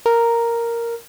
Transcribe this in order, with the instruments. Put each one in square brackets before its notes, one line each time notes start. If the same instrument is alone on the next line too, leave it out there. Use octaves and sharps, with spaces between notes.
[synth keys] A#4